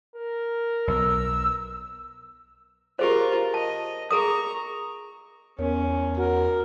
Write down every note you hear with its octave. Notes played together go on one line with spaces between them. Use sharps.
A#4
B1 E6
F4 G4 G#4 A#4 C5
D#5 A5
G#4 A#4 A#5 C#6 D#6
E2 B3 C#4 A#4 C#5
F#4 A#4 F#5